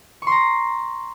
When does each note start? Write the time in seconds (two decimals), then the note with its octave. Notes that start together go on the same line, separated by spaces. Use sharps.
0.22 C#6
0.27 C6
0.32 A#5